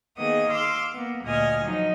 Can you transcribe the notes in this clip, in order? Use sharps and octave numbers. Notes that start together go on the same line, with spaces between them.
D#3 A#3 B3 G#4 D#5 D#6
F5 C6 D6 E6
A#3 B3
D2 A#2 D#5 G#5 D#6 F6
F3 F#3 D#4